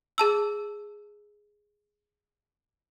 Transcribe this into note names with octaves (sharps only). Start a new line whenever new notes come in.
G#4 A5 E6